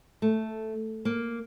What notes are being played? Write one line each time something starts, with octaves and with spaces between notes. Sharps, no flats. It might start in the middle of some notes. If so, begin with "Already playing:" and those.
A3
A#3